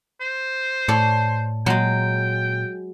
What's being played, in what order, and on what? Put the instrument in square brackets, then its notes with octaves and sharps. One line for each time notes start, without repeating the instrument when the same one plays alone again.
[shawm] C5
[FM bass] A2 [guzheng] A4 C#5 D5
[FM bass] A#2 [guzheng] F#3 G#3 [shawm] G5